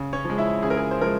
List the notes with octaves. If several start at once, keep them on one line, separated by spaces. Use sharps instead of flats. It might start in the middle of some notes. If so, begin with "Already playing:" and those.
Already playing: C#3
C#4 C#5
F3
G#3
E4 E5
C#3 G#4
A#4
G#4
C5
F3 G#3 A#4